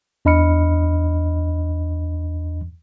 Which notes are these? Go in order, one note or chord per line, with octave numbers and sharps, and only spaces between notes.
E2 D4 D#5 B5 F6 C#7